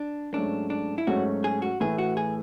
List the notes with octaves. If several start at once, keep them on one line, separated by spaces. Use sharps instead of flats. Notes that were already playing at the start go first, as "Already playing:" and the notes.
Already playing: D4
G#2 F#3 A3 C#4 D4
D4
E4
G#2 F#3 A3 C#4 F#4
G#4
F#4
A2 E3 A3 G#4
F#4
G#4